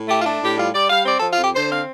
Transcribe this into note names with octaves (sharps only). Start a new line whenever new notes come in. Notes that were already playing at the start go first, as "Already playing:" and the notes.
Already playing: A2
A3 G4
F4
D4
A2 G4
G3 F4
G3 D5
G3 F5
C4 D5
A4
F3
F4
F2 G4
D3 C5
C4 F5